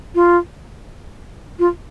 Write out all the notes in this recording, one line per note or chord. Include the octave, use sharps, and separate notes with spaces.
F4
F4